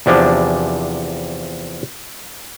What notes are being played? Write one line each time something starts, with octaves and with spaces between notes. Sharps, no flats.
E2 C3 F3 D4 G#5